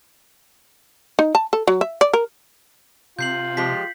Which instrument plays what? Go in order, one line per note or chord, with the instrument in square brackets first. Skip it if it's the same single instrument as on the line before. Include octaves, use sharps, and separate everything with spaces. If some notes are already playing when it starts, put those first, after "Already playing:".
[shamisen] D#4
A5
A4
F#3
E5
D5
A#4
[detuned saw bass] C3 [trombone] F4 [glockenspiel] G6 C7 F#7
[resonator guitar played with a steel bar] F3 G#3 G4 [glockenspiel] B6